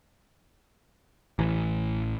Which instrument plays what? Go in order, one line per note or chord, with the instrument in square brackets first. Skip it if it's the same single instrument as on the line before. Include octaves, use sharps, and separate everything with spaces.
[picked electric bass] A1 E3